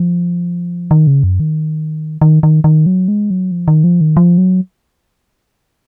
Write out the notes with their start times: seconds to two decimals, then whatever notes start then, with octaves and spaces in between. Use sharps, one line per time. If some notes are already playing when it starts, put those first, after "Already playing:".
Already playing: F3
0.91 D#3
1.07 C#3
1.23 F#2
1.40 D#3
2.21 D#3
2.43 D#3
2.64 D#3
2.86 F#3
3.08 G#3
3.30 F#3
3.51 F3
3.68 D#3
3.84 F3
4.01 D#3
4.17 F3
4.38 F#3